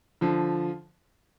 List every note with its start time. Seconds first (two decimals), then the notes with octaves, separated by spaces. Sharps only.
0.21 D3 F3